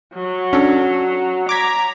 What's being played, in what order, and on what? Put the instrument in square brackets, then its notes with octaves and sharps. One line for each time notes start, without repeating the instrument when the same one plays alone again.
[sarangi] F#3
[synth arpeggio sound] C#4 D4 A4
[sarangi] A#5 [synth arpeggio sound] D6 G#6 B6